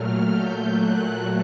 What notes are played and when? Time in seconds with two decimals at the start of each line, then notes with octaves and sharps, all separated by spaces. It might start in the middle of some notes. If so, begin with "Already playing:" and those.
Already playing: A#2 F#3 A3 F6
0.32 G6
0.73 F#6